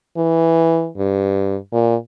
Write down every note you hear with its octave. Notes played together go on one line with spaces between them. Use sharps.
E3
G2
A#2